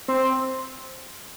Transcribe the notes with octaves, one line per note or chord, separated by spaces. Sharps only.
C4